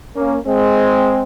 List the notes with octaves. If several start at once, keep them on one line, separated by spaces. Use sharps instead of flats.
A#3 C#4
G#3 C4